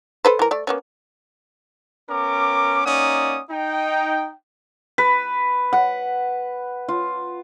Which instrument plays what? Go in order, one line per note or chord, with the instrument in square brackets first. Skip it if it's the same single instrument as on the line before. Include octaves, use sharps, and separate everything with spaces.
[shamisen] A4 B4 C5
E3 A#4
A3 D5
A#3 B3 C#4
[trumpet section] B3 C#4 A#4 D6
A#3 C#4 D#4 D5 F#5 D#6
D#4 G5
[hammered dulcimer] B4
F#5
F4